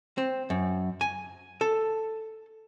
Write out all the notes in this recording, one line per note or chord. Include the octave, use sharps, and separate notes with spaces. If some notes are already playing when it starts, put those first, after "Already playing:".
C4
F#2
G#5
A4